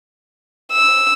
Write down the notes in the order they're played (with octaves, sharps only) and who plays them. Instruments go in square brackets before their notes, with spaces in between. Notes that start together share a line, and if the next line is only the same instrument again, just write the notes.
[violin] E6